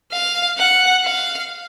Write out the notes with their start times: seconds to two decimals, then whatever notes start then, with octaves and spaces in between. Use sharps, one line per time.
0.13 F5
0.59 F#5
1.06 F5